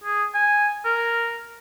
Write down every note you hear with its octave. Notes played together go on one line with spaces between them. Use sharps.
G#4
G#5
A#4